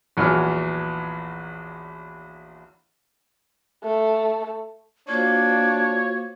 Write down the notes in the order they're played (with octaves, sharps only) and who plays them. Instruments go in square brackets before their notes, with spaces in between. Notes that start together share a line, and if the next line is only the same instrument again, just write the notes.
[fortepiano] A#1 E2 F#3 G#5 F6
[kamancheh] A3
[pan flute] A#3 [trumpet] D4 [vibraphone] F4 F#4 C5 [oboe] C#5